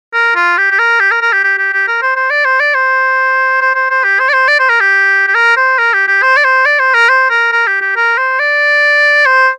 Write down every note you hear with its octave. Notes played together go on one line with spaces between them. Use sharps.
A#4
F4
G4
G4
A#4
G4
A#4
A#4
G4
G4
G4
G4
A#4
C5
C5
D5
C5
D5
C5
C5
C5
C5
G4
C5
D5
C5
D5
C5
A#4
G4
G4
A#4
C5
A#4
G4
G4
C5
D5
C5
D5
C5
A#4
C5
A#4
A#4
G4
G4
A#4
C5
D5
C5